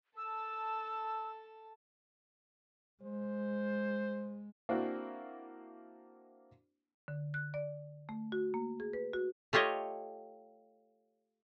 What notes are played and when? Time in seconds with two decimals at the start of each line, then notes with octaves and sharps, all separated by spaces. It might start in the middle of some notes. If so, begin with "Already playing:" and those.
0.17 A4 A5 E6
3.03 G#3 C5
4.69 A#3 C4 D4 E4 F#4
7.08 D3
7.34 F#6
7.54 D5
8.09 A3
8.32 F#4
8.54 A#3
8.80 G#4
8.93 B4
9.13 F#4
9.53 A3 F4 G4 C#5 D#5